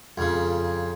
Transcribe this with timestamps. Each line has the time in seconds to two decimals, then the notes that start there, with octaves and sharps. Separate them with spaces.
0.18 F2 C#3